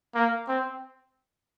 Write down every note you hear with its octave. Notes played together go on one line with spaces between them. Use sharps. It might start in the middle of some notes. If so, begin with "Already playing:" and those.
A#3
C4